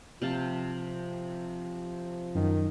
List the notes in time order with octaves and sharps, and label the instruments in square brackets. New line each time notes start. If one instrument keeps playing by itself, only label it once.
[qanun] C3 F5 A5 [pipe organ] F3
[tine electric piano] F#2 [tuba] D#3